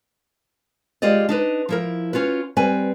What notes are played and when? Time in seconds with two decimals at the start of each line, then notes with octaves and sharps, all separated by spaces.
1.02 G#3 F4 G4 D5 D#5
1.29 D4 D#4 B4
1.69 F3 E4 A#4
2.13 C#4 F4 F#4 B4
2.57 G3 C4 B4 G#5